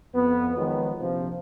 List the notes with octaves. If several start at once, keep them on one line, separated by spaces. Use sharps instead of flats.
F2 B3
D#3 F3 F#3 G#3 B3
A#1 C3 F3